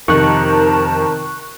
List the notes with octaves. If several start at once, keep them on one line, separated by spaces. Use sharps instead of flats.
F2 C3 D#3 A#4 A5 C#6 F#6